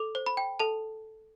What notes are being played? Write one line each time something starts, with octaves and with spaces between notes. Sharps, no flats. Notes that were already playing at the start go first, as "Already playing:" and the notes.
Already playing: A4 D6
C5
B5
G5
A4 A5